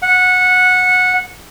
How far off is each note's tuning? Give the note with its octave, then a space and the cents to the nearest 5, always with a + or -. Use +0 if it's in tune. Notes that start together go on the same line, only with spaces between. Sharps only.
F#5 -15